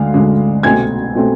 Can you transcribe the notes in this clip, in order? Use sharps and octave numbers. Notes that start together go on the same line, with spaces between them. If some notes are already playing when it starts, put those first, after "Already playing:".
Already playing: D2 D3 G#3 F5
D2 D3 G#3
C2 B2 A3 C4 G#5 G#6
B2 A3 C4